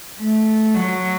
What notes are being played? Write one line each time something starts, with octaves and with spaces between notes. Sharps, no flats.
A3
F#3